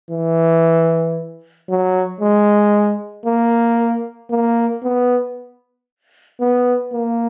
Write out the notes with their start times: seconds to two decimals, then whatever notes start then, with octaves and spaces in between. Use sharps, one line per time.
0.11 E3
1.69 F#3
2.21 G#3
3.26 A#3
4.31 A#3
4.83 B3
6.41 B3
6.94 A#3